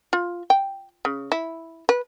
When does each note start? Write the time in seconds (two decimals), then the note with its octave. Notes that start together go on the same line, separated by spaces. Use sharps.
0.13 F4
0.50 G5
1.05 C#3
1.32 E4
1.89 B4